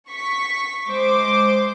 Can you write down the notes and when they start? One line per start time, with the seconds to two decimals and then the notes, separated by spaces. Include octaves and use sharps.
0.10 C#6 B6
0.87 G#3 C5 D6